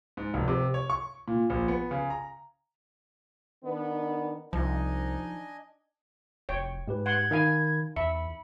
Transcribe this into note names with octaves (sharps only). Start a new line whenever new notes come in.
G#2
F1
C3
C#5
C#6
A#2
A#1
B3
C#3
A#5
D#3 B3 D4
C2 F3 D4 D#4 D#5 G#5
F1 C#5 G5
G#2 G#3 G4 B4
F#5 C6 G#6
D#3 D#4 A#4 F5 G#5 B5
E2 E5 B5 C#7